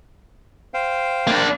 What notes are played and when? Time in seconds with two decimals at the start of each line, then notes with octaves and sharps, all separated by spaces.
0.74 C5 F5 G5
1.27 A#3 D4